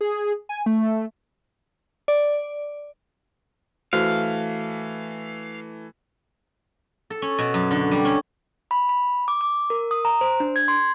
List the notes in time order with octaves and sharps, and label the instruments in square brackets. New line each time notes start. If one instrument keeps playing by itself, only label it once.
[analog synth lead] G#4
G#5
A3
[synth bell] D5
[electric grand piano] E3 A3 [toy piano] F#4 C5 E5 [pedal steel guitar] F5
[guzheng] A4
C#4
B2
F#2
D3
G3
C#4
[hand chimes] B5
B5
D6
D6
A#4
D#6
A#5
C5
D4
G#6
C6